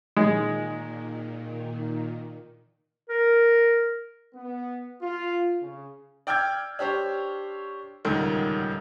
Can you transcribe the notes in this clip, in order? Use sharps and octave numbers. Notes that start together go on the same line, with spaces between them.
A#2 D#3 G#3
A#4
B3
F4
C#3
D5 G5 E6 F6 G6 G#6
D4 G4 C5 C#5
D#1 C#2 D3 D#3